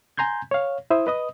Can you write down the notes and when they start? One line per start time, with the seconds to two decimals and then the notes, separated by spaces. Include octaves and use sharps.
0.17 G#5 A#5 C6 G6 G#6
0.51 C#5 F5
0.90 E4 C5 E5 D#6
1.07 B4 D#5 D#6